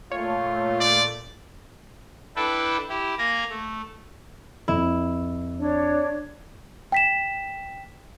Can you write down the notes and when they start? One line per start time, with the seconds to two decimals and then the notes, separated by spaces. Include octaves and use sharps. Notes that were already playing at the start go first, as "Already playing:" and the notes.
0.12 A#2 A3 F4 C#5
0.80 D5
2.36 D4 E4 A4 B4 G5
2.89 E4 G4
3.18 A#3 G#5 A#5
3.50 A3
4.68 F2 E4
5.58 D4 C#5
6.92 G5 B6 E7